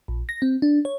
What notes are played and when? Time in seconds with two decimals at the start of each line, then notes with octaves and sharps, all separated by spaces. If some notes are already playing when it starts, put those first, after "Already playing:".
0.08 A#1
0.29 A#6
0.42 C4
0.62 D4
0.85 C#5